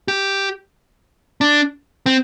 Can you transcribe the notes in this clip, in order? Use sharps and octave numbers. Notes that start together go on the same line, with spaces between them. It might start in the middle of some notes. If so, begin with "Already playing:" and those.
G4
D4
C4